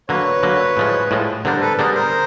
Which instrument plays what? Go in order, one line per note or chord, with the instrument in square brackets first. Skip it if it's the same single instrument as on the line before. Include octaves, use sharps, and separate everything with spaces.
[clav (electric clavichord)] D3 F#3 A#3 [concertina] B4 C#5
[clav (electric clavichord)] D3 F#3 A#3
A2 F3 G#3
A2 F3 G#3
[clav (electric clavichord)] D3 G3 B3 D4 [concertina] A#4 C5
[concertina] A4 B4
[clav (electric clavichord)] D3 G3 B3 D4 [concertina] G#4 A#4
[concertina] A#4 C5